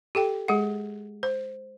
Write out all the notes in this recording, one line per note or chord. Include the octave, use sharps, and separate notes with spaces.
G4 A4 G5
G#3 G#4 F#5
C5